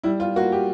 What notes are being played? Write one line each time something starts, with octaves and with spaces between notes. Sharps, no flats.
G3 E4
F4
A#3 F#4
G4